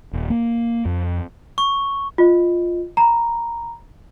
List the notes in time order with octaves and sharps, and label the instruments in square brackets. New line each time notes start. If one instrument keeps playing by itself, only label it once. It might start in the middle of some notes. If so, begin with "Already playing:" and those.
[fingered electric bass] D#1
A#3
F2
[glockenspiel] C#6
[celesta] F4 D#5
A#5 B5